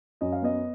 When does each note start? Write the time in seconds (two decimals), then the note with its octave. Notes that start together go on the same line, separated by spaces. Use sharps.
0.21 F#2 D#5
0.32 F5
0.42 B3 D#5